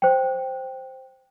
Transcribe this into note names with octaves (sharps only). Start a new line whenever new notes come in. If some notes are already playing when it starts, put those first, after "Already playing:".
C5 G5